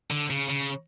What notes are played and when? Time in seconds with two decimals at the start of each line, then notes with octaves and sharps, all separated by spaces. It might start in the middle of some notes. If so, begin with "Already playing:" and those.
0.11 D3
0.30 C#3
0.50 C#3